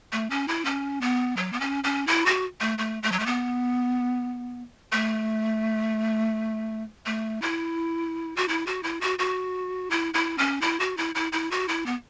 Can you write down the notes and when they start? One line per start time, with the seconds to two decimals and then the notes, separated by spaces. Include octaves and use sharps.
0.12 A3
0.30 C#4
0.48 E4
0.65 C#4
1.01 B3
1.37 F#3
1.53 B3
1.60 C#4
1.84 C#4
2.07 E4
2.26 F#4
2.61 A3
2.78 A3
3.03 A3
3.12 F#3
3.19 A3
3.26 B3
4.92 A3
7.06 A3
7.42 E4
8.36 F#4
8.48 E4
8.67 F#4
8.83 E4
9.01 F#4
9.19 F#4
9.91 E4
10.14 E4
10.38 C#4
10.61 E4
10.80 F#4
10.97 E4
11.15 E4
11.32 E4
11.51 F#4
11.68 E4
11.86 B3